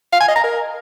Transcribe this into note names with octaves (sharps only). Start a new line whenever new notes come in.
F5
G#5
D#5
A#5
A#4